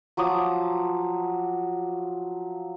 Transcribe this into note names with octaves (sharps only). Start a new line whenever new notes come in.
F3 F#3 D6 D#6